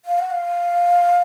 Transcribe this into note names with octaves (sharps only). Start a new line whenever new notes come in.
F5
F#5
F5